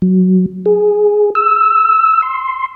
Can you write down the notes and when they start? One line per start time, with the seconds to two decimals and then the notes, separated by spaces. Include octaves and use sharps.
0.02 F#3
0.66 G#4
1.35 E6
2.22 C6